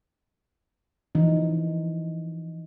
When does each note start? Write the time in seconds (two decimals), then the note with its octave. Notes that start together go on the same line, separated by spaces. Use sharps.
1.15 E3 F3 D#4